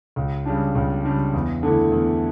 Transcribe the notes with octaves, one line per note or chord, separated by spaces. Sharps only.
C#2
C#3 G3 D4
C#2
C#3 G3 D4
E2
D3 A3 E4
E2